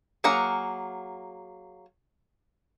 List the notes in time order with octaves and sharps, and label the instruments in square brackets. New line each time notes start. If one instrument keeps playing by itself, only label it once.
[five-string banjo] F#3 A#3 G#4 F#5 A#5